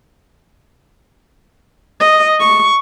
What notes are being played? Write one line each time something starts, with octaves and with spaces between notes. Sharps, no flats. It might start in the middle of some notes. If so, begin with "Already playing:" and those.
D#5
C#6